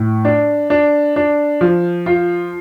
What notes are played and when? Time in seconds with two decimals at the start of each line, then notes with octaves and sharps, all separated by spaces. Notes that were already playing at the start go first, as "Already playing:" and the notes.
Already playing: A2
0.25 D4
0.70 D4
1.16 D4
1.61 F3
2.06 F4